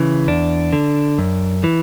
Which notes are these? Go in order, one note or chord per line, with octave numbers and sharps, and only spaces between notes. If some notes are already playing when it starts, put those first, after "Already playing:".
Already playing: C#3 E3
E2 D4
D3
F#2
E3